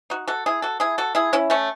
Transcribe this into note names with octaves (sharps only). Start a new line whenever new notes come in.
D#4 F#4
F#4 A4
E4 G#4
F#4 A4
E4 G#4
F#4 A4
E4 G#4
C#4 E4
A3 C#4